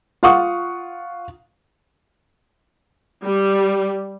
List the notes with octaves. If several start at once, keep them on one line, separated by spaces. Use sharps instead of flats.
F4 F5 F#5 C#6 D#6
G3